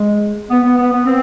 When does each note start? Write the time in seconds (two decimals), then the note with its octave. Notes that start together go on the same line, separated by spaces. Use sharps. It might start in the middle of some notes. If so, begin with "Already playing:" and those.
Already playing: G#3
0.50 B3
0.64 B3
0.78 B3
0.92 B3
1.06 C4